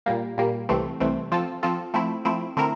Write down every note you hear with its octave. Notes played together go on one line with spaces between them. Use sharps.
A#2 G3 A#3
A#2 G3 A#3
C2 C3 E3 A3 C4
C2 C3 E3 A3 C4
F3 C4 F4 A4
F3 C4 F4 A4
F3 A3 C4 E4
F3 A3 C4 E4
D3 A3 C4 E4 A#4